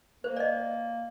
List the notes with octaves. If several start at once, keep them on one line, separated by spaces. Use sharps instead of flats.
A#3 C5
D5 D#5